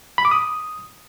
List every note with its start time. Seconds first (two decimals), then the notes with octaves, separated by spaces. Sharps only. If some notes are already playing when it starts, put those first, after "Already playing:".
0.18 B5
0.25 D6
0.31 D#6